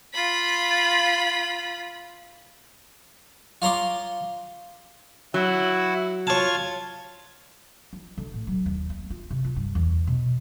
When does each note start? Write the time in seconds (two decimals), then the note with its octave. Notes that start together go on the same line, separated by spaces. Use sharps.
0.13 F4 B5
3.62 F4 C#5 A#5 C6 D6
5.34 F#3 E4 F#4
6.27 F4 C#5 A5 G#6
7.93 F3
8.17 D3
8.34 A2
8.47 F#3
8.66 D#2
8.90 A#3
9.10 F4
9.30 C3
9.45 F4
9.56 G2
9.75 E2
10.07 B2